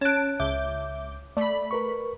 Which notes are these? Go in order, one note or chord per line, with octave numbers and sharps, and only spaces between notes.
C#4 C#5 A5 F#6 D7
C#2 E5 D6 G6
A3 D5 B5
A#4 B4 C#6